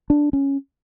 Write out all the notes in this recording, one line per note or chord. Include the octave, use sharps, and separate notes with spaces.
D4
C#4